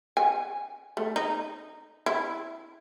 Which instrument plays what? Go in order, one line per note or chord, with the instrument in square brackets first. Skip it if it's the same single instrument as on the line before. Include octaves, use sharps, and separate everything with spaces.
[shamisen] G#5
A3
D#4
E4